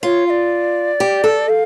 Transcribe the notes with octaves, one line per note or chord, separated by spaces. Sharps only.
F4 C#5
F5
D5
G4
A4
F5